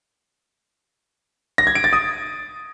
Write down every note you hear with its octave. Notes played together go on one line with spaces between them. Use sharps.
A#6
G#6
D7
A6
D#6